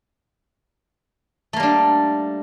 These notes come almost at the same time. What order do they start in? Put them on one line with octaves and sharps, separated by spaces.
A3 A#3 G3 D4